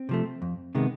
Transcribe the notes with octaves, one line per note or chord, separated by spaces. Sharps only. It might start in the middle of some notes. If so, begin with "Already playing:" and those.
Already playing: C4
C3 F3 A3
F2
C3 D#3 G#3 B3